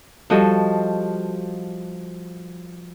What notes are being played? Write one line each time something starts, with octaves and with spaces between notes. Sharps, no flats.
F3 G3 F#4 A4 D#5